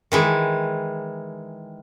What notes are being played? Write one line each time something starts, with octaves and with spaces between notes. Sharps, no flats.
D#3 E3 G#3